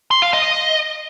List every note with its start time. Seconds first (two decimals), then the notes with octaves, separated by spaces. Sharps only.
0.11 C6
0.22 F5
0.33 D#5